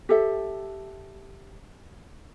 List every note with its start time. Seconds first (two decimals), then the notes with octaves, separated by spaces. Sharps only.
0.09 G4 A4 E5